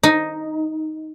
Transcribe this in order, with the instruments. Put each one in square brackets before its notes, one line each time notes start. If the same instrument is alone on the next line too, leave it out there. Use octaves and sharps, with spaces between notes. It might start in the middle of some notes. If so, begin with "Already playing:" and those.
[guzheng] D#4